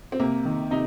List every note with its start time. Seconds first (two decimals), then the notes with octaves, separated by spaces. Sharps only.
0.12 C4
0.20 C3 A#3
0.45 D#3
0.71 C3 D#4